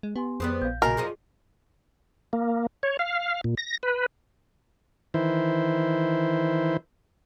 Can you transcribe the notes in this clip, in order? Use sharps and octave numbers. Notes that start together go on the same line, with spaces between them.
G#3
B3 G4 G#5 C6
F2 G3 B3 C4 G#4 D#6 F#6
A#1 F5 G6
F#2 A#2 C#3 F#4 A#4 D#5 G#5
F#2 F3 G#4 D#5
A#3
C#5
F5
A#2
A#6
B4
D#3 E3 E4 C5